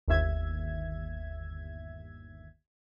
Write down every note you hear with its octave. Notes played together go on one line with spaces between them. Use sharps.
G1 D#2 E5 G#6